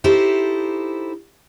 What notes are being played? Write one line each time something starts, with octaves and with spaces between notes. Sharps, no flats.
D#4 E4 G4 A4 C5